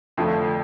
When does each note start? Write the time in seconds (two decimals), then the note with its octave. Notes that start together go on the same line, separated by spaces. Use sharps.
0.17 F2 D3 F3 A3